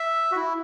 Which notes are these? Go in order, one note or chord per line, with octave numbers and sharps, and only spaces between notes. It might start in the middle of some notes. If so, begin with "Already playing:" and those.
Already playing: E5
F#4
E4